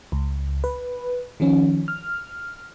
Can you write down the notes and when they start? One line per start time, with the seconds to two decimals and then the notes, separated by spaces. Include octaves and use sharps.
0.12 C#2
0.64 B4
1.40 D#3 F3 C#4
1.88 F6